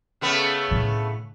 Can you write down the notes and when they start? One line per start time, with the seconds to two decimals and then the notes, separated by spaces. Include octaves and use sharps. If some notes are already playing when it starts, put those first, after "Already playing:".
0.21 C#3 A3 B3
0.71 A2 D3